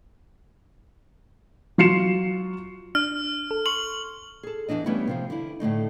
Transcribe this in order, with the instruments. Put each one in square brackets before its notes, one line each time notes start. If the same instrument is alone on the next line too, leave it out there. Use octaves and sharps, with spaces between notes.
[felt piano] F#3 F4 C7 C#7 E7
[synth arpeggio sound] D4 [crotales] F6
[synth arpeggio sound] A4
[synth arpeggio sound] C6 C#6 [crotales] F#7
[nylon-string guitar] G#4 A4
E2 B2 E3 D4 D#5
E3 G3 A3 B3 C#4 E4
C3 F3 C5
D3 E4
A2 D3 A3 D#4